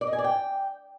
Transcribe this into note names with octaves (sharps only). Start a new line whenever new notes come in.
D5
D#5
G#5
D5
G5